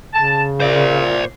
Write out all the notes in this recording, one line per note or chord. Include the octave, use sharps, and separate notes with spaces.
C#3 A5
A#2 C5 D5